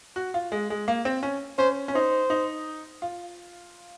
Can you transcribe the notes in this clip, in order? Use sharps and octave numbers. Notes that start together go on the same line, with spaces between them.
F#4
F4
G#3
G#3
A#3
C4
C#4
C#4 C5
C#4
D#4 C5
D#4
F4